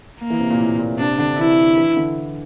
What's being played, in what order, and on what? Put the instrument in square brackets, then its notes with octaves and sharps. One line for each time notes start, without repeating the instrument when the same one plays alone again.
[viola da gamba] A#3
[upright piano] E3
C3
A#2
A2
A#2
[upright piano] C3 [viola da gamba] D4
[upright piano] D3
[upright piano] E3 [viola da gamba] E4
[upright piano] E3
D3